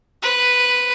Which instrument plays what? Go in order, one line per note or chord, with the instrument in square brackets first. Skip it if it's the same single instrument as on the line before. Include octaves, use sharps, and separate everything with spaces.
[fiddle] B4